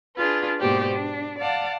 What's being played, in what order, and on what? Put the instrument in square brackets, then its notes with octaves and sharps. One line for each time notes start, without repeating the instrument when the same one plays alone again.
[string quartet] D4 F4 G#4 B4
G#2 B2 A#3 G4 C5 D5
D4
D5 F5 F#5 A5